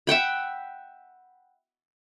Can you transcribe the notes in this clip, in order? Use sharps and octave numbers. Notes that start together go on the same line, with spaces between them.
E5 F#5 G5 B5